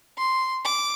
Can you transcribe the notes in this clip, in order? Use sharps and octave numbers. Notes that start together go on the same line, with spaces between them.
C6
D6